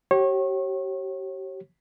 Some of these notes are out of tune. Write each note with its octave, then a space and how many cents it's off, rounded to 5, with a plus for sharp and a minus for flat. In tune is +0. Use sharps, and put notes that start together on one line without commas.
G4 -35 C#5 -30